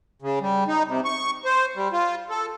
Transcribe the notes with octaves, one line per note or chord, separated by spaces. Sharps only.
C#3
G3
D#4
C3
C#6
C5
G3
F4
A4